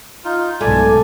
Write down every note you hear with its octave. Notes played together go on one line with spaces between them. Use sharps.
D#4 F4
B1 G#2 A3 D5 G#5